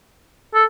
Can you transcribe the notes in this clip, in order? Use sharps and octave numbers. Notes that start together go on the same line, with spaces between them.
A4